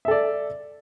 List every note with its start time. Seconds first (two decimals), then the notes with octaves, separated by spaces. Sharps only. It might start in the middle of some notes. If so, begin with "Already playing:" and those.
0.05 E5
0.08 A4
0.11 D5